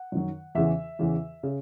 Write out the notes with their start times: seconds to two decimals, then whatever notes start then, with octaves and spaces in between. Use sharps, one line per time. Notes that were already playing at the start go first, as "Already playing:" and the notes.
Already playing: F#5
0.12 F#2 D#3 F#3
0.55 E2 C#3 E3 E5
0.99 E2 C#3 E3
1.43 C#3